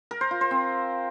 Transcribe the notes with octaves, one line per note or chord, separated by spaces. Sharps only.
A#4
C5
F4
C5
C4